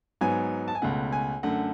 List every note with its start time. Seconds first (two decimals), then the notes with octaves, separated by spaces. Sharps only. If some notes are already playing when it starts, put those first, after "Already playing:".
0.21 G#2 F#3 B3 G#5
0.68 A5
0.75 G#5
0.82 C#2 B2 A3 F#5
1.13 G#5
1.43 F#2 D3 A3 F#5